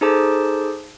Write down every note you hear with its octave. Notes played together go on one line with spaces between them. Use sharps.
D#4 G#4 A4 C5 A5 D6